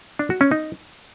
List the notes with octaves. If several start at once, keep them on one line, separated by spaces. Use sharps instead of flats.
D4
F#4
C#4
D#4